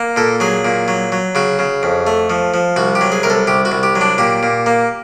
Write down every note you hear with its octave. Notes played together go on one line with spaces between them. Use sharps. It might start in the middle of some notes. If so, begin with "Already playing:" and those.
Already playing: A#3
A#2 A4
F#3 G#4
A#2
F#3
F#3
C#3 F#4
C#3
F2
A3
F3
F3
C2 F#4
G4
F#3
G#4
C2 A#4
A4
C2 G4
F#4
C2
G4
F#3
D4
A#2 G4
A#2
A#3